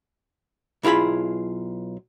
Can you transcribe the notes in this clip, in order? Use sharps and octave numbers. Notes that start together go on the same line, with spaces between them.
B1 E4 F4 G#4 B5